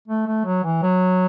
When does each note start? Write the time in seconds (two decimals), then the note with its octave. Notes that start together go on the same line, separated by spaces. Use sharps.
0.08 A3
0.27 A3
0.45 F#3
0.64 E3
0.83 F#3